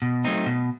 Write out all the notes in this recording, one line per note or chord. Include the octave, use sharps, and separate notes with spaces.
B2
F#3 A3 C4 D#4
B2